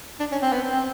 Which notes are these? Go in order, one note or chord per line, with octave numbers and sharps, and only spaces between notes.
D4
C#4
C4
B3
C4